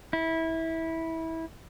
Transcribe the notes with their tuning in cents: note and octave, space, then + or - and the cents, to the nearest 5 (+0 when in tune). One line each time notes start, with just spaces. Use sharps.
E4 -20